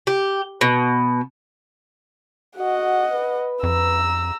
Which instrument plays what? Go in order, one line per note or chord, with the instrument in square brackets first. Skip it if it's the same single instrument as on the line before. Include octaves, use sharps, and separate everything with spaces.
[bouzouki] G4
B2
[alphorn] F#4 [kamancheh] D#5 F#5
[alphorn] B4
[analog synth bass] F2 [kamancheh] A#5 E6